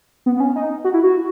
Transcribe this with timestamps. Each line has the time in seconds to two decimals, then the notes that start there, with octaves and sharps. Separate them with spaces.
0.26 B3
0.37 B3
0.40 C#4
0.56 D#4
0.84 F#4
0.94 E4
1.04 F#4